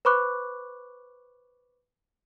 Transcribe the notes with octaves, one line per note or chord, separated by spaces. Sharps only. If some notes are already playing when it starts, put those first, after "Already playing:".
B4 C5 B5 C#6 D6 F#6